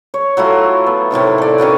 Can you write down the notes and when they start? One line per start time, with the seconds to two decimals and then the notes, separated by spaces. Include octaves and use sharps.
0.14 C#5
0.37 F#3 A3 E4 F4
0.86 B3
1.11 A2 C3 D#3 C#5
1.38 A4 D5
1.58 D#3 C#4 F#4 B4